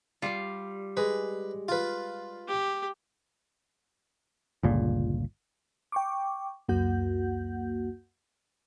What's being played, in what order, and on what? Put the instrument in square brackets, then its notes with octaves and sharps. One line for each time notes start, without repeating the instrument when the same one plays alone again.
[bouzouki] G3 [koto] F4 F5
[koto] G#3 [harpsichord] B4
[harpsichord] F4 B4
[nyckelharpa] G4
[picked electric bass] G1 C#2 A#2
[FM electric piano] G5 C#6 D6
C#2 F#2 A#3 F#4 F#5 G6